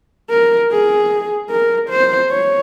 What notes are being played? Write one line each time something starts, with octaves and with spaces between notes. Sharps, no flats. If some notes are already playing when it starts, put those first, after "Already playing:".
A#4
G#4
A#4
C5
C#5